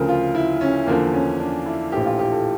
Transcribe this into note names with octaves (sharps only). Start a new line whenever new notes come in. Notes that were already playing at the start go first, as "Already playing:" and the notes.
Already playing: D2 C#3 F3 A#4
F4
E4
C#4
E2 D3 F3 A#3
C#4
D4
E4
A#1 A2 E3 G4
F4
G4
A4